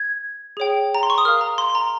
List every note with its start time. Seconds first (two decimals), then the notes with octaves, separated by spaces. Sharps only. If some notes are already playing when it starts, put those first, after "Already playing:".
Already playing: G#6
0.57 G#4 C#5 G5
0.95 A#5
1.03 C6
1.10 C#6
1.18 D#6
1.25 A#4 F5 F6
1.41 A#5
1.58 C6
1.70 C6
1.75 A#5